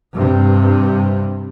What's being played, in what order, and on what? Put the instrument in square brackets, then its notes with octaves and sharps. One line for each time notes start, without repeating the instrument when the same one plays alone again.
[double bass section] G2 C3